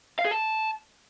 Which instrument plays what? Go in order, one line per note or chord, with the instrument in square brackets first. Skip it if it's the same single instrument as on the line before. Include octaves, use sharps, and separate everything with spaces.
[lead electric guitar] F5
G#4
A5